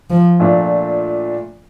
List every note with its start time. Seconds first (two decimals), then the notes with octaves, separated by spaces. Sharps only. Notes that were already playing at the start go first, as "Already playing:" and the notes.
0.10 F3
0.40 A#2 A3 D4 F4